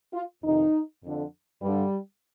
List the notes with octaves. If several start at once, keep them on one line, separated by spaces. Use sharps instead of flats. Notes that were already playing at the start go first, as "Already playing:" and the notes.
F4
F2 C3 D#3 D#4
F2 D3
G2 D3 G3